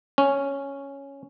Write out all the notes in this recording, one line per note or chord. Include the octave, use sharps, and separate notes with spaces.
C#4